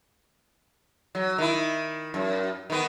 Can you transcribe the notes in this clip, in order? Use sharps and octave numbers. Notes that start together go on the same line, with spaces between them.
F#3
D#3 E4
F#2
D#3 B3